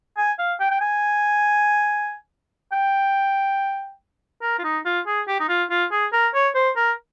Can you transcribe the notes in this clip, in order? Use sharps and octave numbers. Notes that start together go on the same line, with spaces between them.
G#5
F5
G5
G5
G#5
G5
A#4
F4
D#4
F4
G#4
G4
D#4
F4
F4
G#4
A#4
C#5
C5
A#4